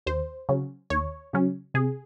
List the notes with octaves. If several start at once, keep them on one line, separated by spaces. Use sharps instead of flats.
D#2 C5
C#3 F#3 C#4
D#2 C#5
C#3 F#3 C#4
C3 G#4